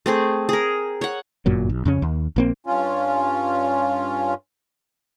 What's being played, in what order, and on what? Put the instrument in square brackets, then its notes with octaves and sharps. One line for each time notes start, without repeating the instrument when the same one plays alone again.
[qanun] A3 C4 G#4
G#4 A#4
C#5 F#5
[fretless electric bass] G1 F#2 A#2 F#3
B1
F2 C#3 C#4
D#2
A#1 A#3 C4
[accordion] G2 C#4 F4